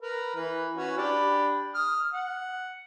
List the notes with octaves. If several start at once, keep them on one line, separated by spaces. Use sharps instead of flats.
A#4 B4
E3 B4
C#4 F#4 B4
D4 G4 B5
D#6 F6
F#5